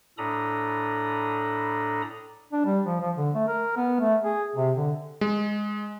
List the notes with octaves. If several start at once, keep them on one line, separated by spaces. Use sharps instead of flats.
A2 D4 A4 A#5 B5 D#6
D4
G3
F3
F3
D3
A3
A#4
B3
A3
G#4
C3
D3
G#3